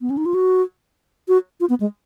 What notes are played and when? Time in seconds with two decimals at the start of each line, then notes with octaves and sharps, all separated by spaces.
0.01 B3
0.10 C#4
0.17 D#4
0.26 F4
0.34 F#4
1.28 F#4
1.60 F4
1.69 B3
1.80 G#3